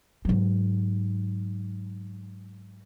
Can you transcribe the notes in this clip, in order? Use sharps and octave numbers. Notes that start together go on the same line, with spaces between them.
G#2 F#3